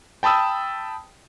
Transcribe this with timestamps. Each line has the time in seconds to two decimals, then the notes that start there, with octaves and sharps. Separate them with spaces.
0.23 G5 A5 B5 D#6 E6